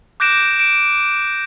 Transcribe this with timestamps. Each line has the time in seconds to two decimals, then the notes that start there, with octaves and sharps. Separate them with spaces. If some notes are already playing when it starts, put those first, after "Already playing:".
0.20 D6 F#6 G6 A#6 D7 E7
0.59 D7 E7